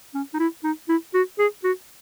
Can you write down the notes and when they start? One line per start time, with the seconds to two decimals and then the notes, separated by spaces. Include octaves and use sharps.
0.14 C#4
0.34 D#4
0.39 E4
0.64 D#4
0.89 E4
1.14 F#4
1.39 G#4
1.64 F#4